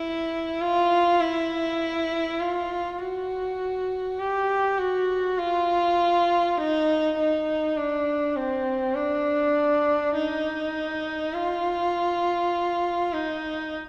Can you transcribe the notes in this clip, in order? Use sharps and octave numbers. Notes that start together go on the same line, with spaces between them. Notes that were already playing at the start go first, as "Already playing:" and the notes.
Already playing: E4
F4
E4
F4
F#4
G4
F#4
F4
D#4
D#4
D4
C4
D4
D#4
F4
D#4